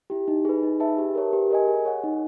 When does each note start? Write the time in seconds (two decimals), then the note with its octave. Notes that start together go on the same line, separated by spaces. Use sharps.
0.10 E4 G4
0.28 D#4
0.45 G#4 B4
0.63 D#4
0.80 G#4 B4 E5 A5
0.98 G4
1.15 A#4 C#5
1.33 G4
1.50 A#4 D#5 G#5
1.68 G#4
1.85 C#5 F#5
2.04 D#4